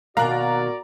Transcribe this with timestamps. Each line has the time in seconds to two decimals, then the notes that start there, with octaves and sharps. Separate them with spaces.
0.17 B2 D#3 A#3 F#4 D5 F5 A#5 F#6